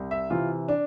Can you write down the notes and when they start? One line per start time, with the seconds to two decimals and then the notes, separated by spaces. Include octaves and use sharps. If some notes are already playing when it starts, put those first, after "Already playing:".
Already playing: C2
0.11 E5
0.30 C3 E3 F4
0.68 D4